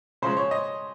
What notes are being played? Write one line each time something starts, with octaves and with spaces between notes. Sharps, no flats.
C#3 F3 G#3 C5
C#5
D#5